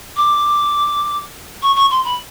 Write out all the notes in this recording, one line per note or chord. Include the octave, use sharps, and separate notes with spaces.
D6
C#6
C#6
C6
B5